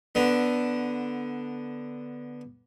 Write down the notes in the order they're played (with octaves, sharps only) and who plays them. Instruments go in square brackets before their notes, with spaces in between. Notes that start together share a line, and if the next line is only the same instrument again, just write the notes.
[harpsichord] D3 B3